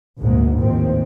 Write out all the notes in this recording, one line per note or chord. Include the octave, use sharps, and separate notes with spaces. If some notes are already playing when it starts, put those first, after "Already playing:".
G#1 D2 G#2 B2 A#3
A1 D#2 G#2 D#3 F3 C4